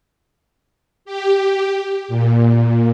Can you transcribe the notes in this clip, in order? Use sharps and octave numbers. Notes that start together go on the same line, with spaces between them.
G4
A#2